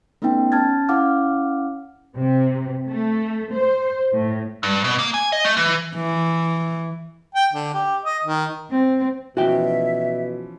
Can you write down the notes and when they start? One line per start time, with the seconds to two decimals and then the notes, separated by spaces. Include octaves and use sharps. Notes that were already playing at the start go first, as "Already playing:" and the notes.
0.22 A3 B3 C#4 D#4 G5
0.52 C#4 A5 F6 G#6 A6
0.89 C#4 E4 F5 F#5 D6 F6
2.19 C3
2.88 A3
3.53 C5
4.12 A2
4.63 G2
4.84 B2
4.99 A#3
5.14 G#5
5.32 D#5
5.45 A3
5.57 E3
5.95 E3
7.35 G5
7.53 D3
7.74 G4
8.05 D#5
8.24 D#3
8.71 C4
9.37 B2 E3 F3 C#4 F#4 E5 G5